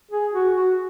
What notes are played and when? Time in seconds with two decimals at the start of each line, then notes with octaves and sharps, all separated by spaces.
0.11 G#4
0.34 F#4
0.56 F#4